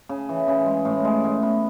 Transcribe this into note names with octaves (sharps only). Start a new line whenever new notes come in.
C#3
E3
C#3
G#3
A2
G#3
A2
B3